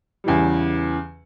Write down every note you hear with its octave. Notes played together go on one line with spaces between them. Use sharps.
E2 C#3 E3 G3